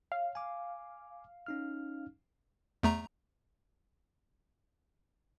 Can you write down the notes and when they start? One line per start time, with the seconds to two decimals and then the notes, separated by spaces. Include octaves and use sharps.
0.12 C#5 F5
0.35 G#5 D6
1.46 C#4 D#4 F6
2.83 E2 A3 A#5